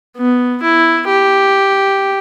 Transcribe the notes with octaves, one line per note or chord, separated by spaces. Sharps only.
B3
E4
G4